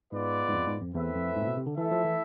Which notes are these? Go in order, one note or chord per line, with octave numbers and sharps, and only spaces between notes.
G#2 G#3 B3 F4 B4 D5
G#2
F2
G#2
F2
E2 A3 C4 E4 B4 E5
F2
G#2
A2
B2
C3
D3
E3 A3 E4 A4 E5
F3
E3